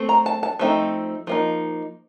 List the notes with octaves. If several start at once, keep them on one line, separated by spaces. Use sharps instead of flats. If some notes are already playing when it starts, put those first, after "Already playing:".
Already playing: A3 C4
A#5
A5
A5
F3 A3 C4 D#4
F3 A#3 D#4